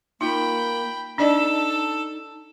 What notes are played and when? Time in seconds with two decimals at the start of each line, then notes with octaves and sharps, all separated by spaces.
0.21 A#3 D#4 F4 G5 B5
1.18 D4 D#4 A4 D5 D#5 A5